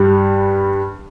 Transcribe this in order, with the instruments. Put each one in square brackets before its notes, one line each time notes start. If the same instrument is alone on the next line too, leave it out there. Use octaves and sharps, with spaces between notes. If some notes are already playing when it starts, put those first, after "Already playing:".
Already playing: [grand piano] G2 G3